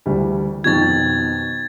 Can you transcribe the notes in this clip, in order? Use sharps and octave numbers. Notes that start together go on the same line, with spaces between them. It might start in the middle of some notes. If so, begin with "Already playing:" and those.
D2 E3 G3
F2 B2 D#3 G#6 A6